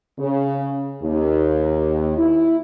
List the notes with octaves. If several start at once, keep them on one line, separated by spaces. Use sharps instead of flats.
C#3
D#2
E4